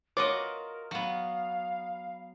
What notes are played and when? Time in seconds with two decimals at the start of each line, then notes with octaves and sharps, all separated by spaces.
0.17 F4 F#4 A#4 B4 C#5 D#5 D6
0.91 F#3 B3 F5